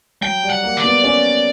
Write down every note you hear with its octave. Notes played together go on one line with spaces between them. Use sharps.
F#3 G5
G3
F#5
A#3
D5
B3
C#4